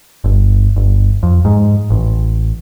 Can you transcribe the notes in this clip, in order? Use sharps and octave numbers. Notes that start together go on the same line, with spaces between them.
G1
G1
F2
G#2
A1